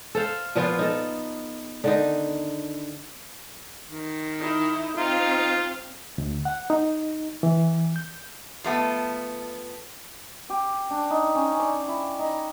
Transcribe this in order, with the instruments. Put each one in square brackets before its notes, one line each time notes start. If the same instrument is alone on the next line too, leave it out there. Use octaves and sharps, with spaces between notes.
[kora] A4 C5 F5
A#2 F3 B3 F4
D#4 A4
D3 D#3 D#4
[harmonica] D#3
[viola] D#4 E4
[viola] C4 F5 [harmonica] D#4 F4
[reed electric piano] D2
F#5
D#4
E3
G6
[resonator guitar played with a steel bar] F3 A3 B3
[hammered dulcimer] G4
D4
D#4
C#4
D5
E4
D#4